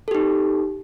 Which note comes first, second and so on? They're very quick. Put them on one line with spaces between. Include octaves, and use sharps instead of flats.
A4 G4 D#4